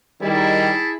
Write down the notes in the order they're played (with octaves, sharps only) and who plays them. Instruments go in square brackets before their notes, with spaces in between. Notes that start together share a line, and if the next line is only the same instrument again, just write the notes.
[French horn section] D#3 G3 [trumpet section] E4 G#4 A5